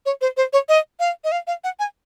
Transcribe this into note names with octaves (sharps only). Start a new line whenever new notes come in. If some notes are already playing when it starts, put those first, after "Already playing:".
C#5
C5
C5
C#5
D#5
F5
D#5
F5
F5
F#5
G#5